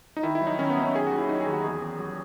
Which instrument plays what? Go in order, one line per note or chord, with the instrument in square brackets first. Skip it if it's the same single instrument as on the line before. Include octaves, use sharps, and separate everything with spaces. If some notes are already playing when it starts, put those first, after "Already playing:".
[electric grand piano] D#4
D#3 E4
E4
F#3
D#4
D#3 C#4
B3
F#3
C#4
D#3 G#4
D#2 F#4
E4
F#3 D#4
G#4
D#2
F#4
E2 G#4
E2
F#3